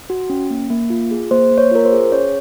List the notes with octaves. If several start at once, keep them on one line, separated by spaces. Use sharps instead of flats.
F#4
C#4
A#3
A#3
F4
G#4
A#3 C5
A#3
C#5
F4 A#4
C5
G#4
C#4 C#5